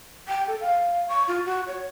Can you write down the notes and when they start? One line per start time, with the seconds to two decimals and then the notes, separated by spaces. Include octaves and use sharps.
0.28 G5
0.47 A4
0.61 F5
1.09 C#6
1.28 F4
1.46 F#4
1.67 C#5